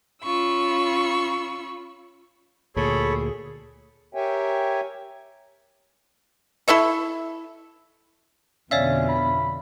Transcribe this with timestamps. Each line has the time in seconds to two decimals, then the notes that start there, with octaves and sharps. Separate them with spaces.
0.23 C#4 F4 B5 C#6 E6
2.76 D2 A#2 G#4 A4 C#5 B5
4.15 G4 A#4 C#5 E5 G5 G#5
6.68 E4 A4 E5 C#6
8.71 F2 B2 D3 C#4 C#5 D5 E5 F5
9.08 B5